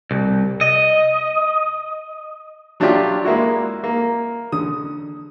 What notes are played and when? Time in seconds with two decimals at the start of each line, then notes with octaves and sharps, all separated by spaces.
0.11 C2
0.61 D#5
2.80 F#3 D4 E4 F4 G4
3.25 G#3 A#3 E4 F#4
3.84 A#3
4.52 D3 D#6